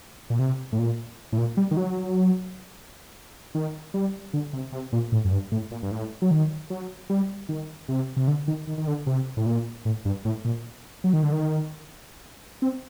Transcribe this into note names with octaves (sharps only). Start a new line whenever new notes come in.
A#2
C3
A2
A#2
A2
A#2
G3
D#3
F#3
D#3
G3
D3
C3
C3
A#2
A2
F#2
G2
A2
A#2
G2
A2
F#3
D#3
F#3
G3
D#3
C3
C3
D3
D#3
D#3
D#3
D3
C3
A2
A#2
A2
G2
A2
A#2
F#3
D#3
D3
D#3
C4